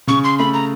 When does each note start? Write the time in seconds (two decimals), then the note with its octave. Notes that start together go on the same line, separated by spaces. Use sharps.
0.07 C#3 C#6
0.24 C6
0.39 A3 B5
0.54 A#5